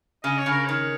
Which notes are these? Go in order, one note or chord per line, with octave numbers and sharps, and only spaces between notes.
C#3 D#5
C#5
C#3
A#4
D#3 C#5